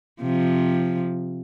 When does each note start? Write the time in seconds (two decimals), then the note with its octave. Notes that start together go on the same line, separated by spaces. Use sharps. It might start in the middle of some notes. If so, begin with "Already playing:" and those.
0.21 C3 F3